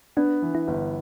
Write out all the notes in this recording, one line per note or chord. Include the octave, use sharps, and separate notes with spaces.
B3 D4
E3
E4
G1